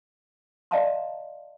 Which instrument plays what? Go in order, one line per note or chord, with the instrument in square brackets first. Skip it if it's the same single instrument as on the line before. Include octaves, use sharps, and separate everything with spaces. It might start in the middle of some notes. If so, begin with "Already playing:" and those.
[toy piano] D5 D#5 F5 A5 A#5 C6